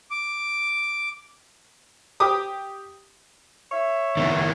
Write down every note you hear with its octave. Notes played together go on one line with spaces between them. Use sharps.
D6
G4 D6 D#6
C#5 E5
D#3 B3 E4